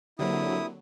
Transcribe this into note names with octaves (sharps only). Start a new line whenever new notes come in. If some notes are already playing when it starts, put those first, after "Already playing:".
D3 F#3 A#3 C4 E4 G4 D#6